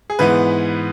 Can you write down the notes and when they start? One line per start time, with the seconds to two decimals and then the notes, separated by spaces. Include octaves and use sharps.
0.10 G#4
0.19 G#2 E3 G#3 B3 B4